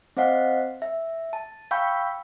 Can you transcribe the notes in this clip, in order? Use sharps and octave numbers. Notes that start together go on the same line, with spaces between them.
C4 C5 D#5 F5 F#5
E5
A5
F5 G5 B5 C#6 E6 G6